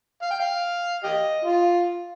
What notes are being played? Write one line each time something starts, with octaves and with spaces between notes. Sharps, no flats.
F5
G5
F5
G4 D#5
F4